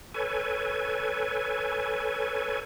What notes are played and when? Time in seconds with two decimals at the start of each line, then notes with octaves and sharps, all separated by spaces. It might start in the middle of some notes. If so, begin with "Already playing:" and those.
0.14 A4 B4 C#5 G#5